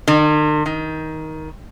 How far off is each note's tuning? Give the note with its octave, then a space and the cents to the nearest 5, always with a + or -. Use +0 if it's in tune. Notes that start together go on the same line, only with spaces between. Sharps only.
D#3 -45
D#3 +15